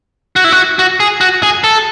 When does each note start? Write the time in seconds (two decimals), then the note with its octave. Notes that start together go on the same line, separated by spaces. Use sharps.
0.36 F#4
0.44 E4
0.52 F#4
0.79 F#4
1.00 G#4
1.21 F#4
1.43 G#4
1.64 A4